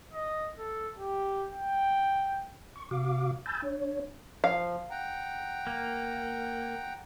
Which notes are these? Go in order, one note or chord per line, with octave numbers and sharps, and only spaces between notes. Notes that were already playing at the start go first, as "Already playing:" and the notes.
D#5
A4
G4
G5
C#6
C3 F#4 F5 D6
G#5 A5 B5 E6 G6 A6
D4 C#5
F3 F5
F#5 G5 A#5
A#3